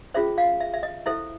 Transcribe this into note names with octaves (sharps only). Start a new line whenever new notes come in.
C#4 F4 G#4 C5 E5
F5
E5
E5
D#5
E4 A4 C5 E5